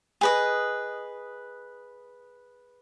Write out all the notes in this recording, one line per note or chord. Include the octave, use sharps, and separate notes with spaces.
G#4 B4 D#5